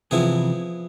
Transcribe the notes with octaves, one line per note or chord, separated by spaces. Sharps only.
C3 E3 F3 B3 E4 G#4